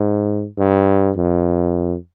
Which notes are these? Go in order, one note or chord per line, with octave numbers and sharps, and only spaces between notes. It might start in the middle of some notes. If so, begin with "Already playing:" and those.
Already playing: G#2
G2
F2